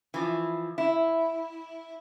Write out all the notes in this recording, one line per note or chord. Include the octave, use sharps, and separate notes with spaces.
E3 F3
E4